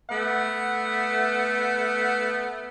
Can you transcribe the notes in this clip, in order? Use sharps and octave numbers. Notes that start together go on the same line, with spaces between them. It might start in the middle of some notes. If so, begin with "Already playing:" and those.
A3 B3 F#5